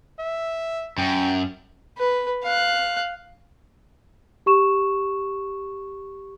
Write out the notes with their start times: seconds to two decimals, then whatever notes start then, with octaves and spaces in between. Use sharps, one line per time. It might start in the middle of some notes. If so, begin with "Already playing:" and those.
0.19 E5
0.98 F#2 G5
1.98 B4
2.43 F5 F#6
4.46 G4 C#6 E7